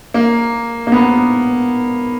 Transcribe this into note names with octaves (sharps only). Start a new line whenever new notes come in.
A#3
A#3
B3